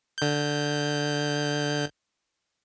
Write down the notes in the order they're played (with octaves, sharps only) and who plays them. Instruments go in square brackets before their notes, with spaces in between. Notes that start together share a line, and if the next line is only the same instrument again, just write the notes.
[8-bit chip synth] D3 G6